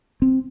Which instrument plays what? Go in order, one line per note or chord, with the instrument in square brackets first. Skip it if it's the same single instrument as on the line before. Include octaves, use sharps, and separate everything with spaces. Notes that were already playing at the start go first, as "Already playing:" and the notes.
[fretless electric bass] C4